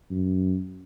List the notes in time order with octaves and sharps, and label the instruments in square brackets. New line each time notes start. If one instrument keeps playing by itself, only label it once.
[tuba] F#2